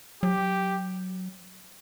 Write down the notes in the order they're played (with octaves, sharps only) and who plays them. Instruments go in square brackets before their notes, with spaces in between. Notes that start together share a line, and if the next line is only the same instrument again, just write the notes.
[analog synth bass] F#3 [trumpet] G4